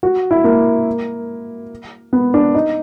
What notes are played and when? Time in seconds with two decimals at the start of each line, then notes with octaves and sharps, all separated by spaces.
0.03 F#4
0.31 E4
0.44 A#3
2.13 B3
2.34 D4
2.55 D#4